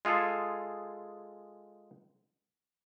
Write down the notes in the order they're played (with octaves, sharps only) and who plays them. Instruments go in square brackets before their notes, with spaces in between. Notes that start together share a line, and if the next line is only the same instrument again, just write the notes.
[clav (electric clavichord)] G#3 F4 G#4 A4